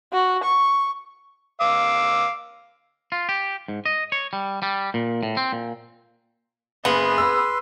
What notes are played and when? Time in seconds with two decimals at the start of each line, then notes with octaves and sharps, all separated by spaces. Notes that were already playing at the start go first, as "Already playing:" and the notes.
0.12 F#4
0.43 C#6
1.61 F5 D6 E6
3.12 F4
3.29 G4
3.68 G#2
3.86 D#5
4.12 C#5
4.33 G3
4.63 G3
4.94 A#2
5.23 A2
5.37 C4
5.52 A#2
6.85 F#1 B3 G#4 B4 C6
7.18 E6